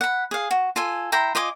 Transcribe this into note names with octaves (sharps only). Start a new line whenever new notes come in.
F#5 B5
G#4 F5
F#4
F4 A4 G#5
E4 G5 A#5 C6
F4 D#5 G#5 D6